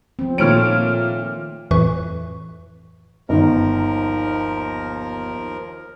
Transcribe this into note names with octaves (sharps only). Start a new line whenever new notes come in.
F3 C4
A#2 D#3 A3 C#5 F6 D7
F2 A2 E3 B4 C#6
G1 D#2 D#3 F3 A#4